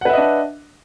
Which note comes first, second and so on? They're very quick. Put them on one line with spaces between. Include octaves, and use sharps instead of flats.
F#5 B4 E5 D#5 D4